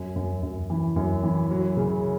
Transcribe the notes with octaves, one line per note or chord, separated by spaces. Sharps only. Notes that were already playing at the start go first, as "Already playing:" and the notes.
Already playing: F#2
F#2
F#2
E3
F#2
E3
F#3
C#3